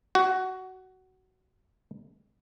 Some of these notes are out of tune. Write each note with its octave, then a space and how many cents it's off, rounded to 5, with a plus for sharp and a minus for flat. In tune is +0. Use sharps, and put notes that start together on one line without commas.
F#4 +15